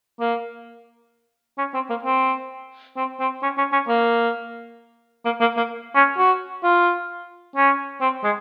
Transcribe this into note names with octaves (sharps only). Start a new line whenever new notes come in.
A#3
C#4
C4
A#3
C4
C4
C4
C#4
C#4
C#4
A#3
A#3
A#3
A#3
C#4
F#4
F4
C#4
C4
G#3